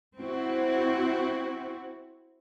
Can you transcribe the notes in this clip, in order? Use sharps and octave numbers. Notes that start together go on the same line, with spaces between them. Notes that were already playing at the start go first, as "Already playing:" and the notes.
C4 E4 F#4